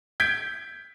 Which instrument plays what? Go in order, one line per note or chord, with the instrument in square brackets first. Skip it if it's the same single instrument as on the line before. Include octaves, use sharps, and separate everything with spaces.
[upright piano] G6 G#6 B6 D7